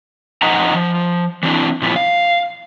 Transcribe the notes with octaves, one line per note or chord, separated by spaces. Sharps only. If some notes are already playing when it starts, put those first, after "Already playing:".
F2 D#4 D#5 F#5 A#5
F3
E3 F#3 C4 D4 E4
A#2 F3 B3 E4
F5